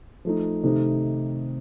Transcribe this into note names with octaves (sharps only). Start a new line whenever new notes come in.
F3 A3 D#4
C3 D#3 A3 D#4